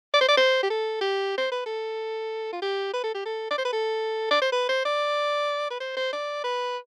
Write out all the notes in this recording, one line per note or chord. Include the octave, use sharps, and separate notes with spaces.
D5
C5
D5
C5
G4
A4
G4
C5
B4
A4
F4
G4
B4
A4
G4
A4
D5
C5
B4
A4
D5
C5
B4
C5
D5
B4
C5
C5
D5
B4